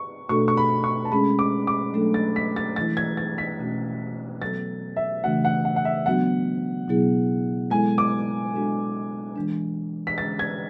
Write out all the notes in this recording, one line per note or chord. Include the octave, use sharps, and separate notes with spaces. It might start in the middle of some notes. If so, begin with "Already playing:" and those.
Already playing: C#6
B2 A3 D4 F#4 A4 C#6
C#6
B5
C#6
A5
G#3 C#4 G#4 B5
D6
D6
F#3 A3 D4 A4
A6
B6
A6
E3 A3 E4 A6
G#6
A6
B6
B2 A3 C#4 F#4
F#3 B3 F#4 A4 A6
E5
C#3 E3 A3 D4 F#4 F#5
F#5
F#5
F#5
E5
F#3 B3 D4 F#4 F#5
B2 F#3 B3 E4 G#4
G#3 B3 E4 A4 G#5
D6
G#3 D4 F#4 A4
E3 G#3 D4
B6
D3 G#3 C#4 A6
G#6